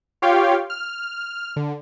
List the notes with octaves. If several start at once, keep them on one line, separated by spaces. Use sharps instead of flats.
F4 G4 C#5 F5 G5
F6
D3